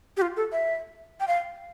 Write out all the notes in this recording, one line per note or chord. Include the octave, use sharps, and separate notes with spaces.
G4
F4
A4
E5
G5
F5